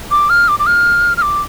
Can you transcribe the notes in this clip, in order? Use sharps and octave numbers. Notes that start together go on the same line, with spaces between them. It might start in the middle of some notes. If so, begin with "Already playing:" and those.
D6
F6
D6
D6
F6
F6
D6